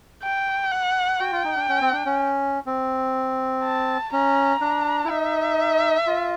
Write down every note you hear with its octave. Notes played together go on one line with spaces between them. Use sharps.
G5
F#5
F#4 G5
F4
D#4
D4
C#4
C4
D4
C#4
C4
A5
C#4 A#5
D4
E4
D#4 E5
F4